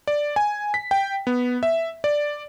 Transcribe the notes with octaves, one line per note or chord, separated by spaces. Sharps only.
D5
G#5
B6
G5
B3
E5
D5